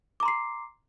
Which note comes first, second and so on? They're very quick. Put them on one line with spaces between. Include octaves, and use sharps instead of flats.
D6 A#5 C6 C7